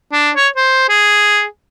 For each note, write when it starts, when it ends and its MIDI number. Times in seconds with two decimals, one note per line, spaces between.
0.13 0.31 62
0.36 0.48 73
0.56 0.86 72
0.89 1.45 68